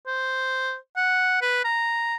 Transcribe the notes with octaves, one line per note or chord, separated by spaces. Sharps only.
C5
F#5
B4
A#5